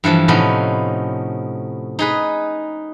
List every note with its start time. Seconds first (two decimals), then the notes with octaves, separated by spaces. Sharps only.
0.04 G2 E3 F3 A4
0.28 A2 C3 F3 B3 C#4 D#4
1.99 D#4 G#4 B4